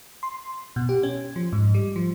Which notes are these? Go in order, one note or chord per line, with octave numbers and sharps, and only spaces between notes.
C6
B2
G4
C#4
F3
G#2
G3
F3